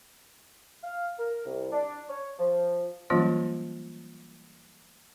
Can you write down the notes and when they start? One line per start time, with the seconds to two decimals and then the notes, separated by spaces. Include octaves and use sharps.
0.82 F5
1.18 A#4
1.45 C2
1.71 D4
2.09 C#5
2.38 F3
3.10 E3 F#3 G3 A#3 C#4 F4